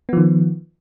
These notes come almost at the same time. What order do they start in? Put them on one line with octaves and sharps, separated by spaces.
B3 F3 D#3